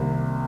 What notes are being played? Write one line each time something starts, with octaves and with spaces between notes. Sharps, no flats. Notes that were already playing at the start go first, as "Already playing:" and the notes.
Already playing: C2 C3 D#3 A#3